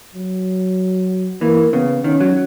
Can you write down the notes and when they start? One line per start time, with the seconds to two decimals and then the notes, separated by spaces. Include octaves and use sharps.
0.15 F#3
1.41 E3 A#3
1.73 C#3 B3
2.04 D#3 C#4
2.20 F#3